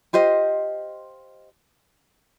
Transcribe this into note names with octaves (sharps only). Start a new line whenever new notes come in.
F4 G4 C5 D#5